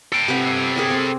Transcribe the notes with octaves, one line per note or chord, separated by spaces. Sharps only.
A4 G5
C3 B4 F#5
G#4 A#4 D5
C4